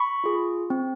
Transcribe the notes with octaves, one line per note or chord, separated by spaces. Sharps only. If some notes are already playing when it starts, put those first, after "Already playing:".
Already playing: B5 C#6
F4 G#4
C4